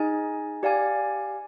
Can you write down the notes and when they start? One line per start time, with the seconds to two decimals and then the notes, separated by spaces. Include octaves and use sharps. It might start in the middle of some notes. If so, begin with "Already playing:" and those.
Already playing: D#4 G#4 D#5 G#5
0.63 G4 D5 F5 G#5